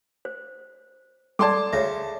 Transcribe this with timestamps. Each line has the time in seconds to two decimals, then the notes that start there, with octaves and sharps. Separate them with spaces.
0.25 C5
1.39 G3 G#3 A4 D5 A5 C6 D6
1.73 D2 C#3 E5